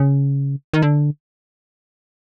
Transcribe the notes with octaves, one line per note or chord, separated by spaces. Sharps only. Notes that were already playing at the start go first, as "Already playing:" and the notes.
Already playing: C#3
D#3
D3